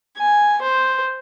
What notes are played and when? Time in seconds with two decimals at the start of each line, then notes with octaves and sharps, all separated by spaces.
0.18 G#5
0.62 C5